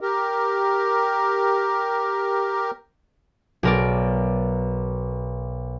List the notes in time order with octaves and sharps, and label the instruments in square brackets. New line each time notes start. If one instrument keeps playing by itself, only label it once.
[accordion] G4 A#4
[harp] B1 A#4 D5